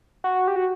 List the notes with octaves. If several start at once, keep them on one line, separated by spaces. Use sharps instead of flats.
F#4
G4
F#4